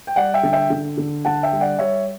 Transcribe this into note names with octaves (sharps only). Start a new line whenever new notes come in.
G5
G3 D5 F#5
E5 G5
D3
E5 G5
D3
D3
D3 F#5 A5
E5 G5
G3
D5 F#5
G3 C#5 E5